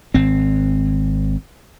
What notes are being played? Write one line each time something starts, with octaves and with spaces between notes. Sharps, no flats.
G#1 C4